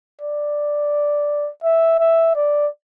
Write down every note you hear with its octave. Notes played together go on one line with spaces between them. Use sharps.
D5
E5
E5
D5